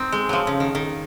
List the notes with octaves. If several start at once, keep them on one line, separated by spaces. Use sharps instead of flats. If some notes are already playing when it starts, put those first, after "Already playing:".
Already playing: C4 D#4
G#3
F3 F#3
C#3
D#3
D#3